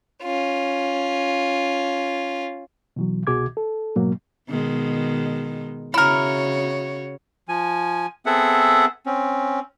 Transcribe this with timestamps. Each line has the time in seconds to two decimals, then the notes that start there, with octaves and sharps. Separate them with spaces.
0.23 C#4 F4
2.96 B2 E3 F#3
3.27 C2 B2 F#4 G#4 D6 G#6
3.57 A4
3.96 G#2 B2 F#3 A#3
4.49 B2 D#3 G#3
5.94 C#3 E4 F#4 A#4 C#5
7.49 F3 G#5
8.26 B3 C4 G#4 A4 E5 F#5
9.06 C4 C#4